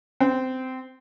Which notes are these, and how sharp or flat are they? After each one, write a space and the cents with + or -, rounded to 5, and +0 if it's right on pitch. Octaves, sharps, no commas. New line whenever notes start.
C4 -20